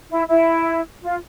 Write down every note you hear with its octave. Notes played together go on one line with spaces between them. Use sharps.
E4
E4
F4